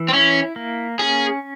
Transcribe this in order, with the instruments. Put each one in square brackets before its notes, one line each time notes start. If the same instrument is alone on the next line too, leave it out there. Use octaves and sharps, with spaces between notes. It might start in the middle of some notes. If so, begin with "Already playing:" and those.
Already playing: [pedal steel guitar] E3
[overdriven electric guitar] C4
[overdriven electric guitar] C#4 [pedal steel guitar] E4
[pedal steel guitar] A#3
[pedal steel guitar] C#4 [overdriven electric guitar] G#4